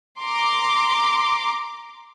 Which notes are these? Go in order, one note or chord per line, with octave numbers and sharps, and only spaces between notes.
A#5 C6 D6